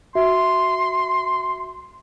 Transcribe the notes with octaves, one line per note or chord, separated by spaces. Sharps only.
F#4 E5 C6